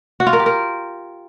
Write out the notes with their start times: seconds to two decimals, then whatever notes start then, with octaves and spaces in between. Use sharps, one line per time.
0.20 F#4
0.27 F4
0.33 A#4
0.40 G4
0.46 A#4